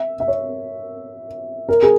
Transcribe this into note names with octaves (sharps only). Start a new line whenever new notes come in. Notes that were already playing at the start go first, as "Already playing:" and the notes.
Already playing: E5
E5
C#5
A#4
G#4